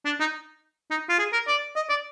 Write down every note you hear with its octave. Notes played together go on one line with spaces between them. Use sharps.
D4
D#4
D#4
F4
G#4
A#4
D5
D#5
D5